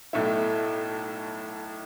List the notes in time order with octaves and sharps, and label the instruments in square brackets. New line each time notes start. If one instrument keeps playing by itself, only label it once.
[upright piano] B1 A2 A3 E4